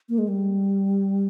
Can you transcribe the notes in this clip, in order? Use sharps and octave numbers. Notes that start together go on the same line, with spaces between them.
A#3
G#3
G3